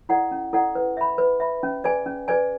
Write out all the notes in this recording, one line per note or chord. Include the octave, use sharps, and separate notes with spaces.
E4 A4 D5 F#5
C#4
E4 A4 D5 F#5
B4
E5 B5
B4
E5 B5
C#4
G#4 B4 D5 G#5
C#4
G#4 B4 D5 G#5